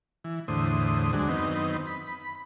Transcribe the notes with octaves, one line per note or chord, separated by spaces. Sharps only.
E3
E2 A2 D3 C5 D#6
D2 F#3 G#3 D4
F#2 D#3 B3 C4 D#4
B5